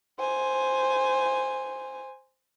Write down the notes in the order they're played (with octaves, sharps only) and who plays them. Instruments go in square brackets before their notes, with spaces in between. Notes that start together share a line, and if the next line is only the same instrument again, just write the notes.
[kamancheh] C5 G#5